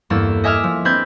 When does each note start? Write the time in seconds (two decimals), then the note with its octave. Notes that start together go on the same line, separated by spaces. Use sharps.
0.10 E2 G2 A#3 A4 E6
0.44 D#5 E5 G#5 D6 E6 F6
0.64 F3
0.85 C4 D4 B4 E6 G6 G#6